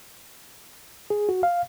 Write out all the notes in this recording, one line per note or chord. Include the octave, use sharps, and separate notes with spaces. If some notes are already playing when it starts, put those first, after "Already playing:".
G#4
F#4
F5